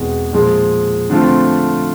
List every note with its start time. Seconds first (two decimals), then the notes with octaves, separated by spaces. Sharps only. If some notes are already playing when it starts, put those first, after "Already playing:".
Already playing: E2 B2 G#3 C4
0.33 A#2 F3 G#3
1.10 D3 F3 A3 C4 F4